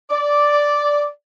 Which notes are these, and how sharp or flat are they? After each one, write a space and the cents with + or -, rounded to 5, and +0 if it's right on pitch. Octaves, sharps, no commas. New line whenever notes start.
D5 -5